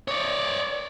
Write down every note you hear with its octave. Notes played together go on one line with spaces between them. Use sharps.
C#5 D5